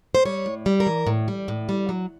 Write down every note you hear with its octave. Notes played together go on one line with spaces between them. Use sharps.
C5
G3 C#5
A2
G3
A#4
E3
A2
G3
A2
G3
F#3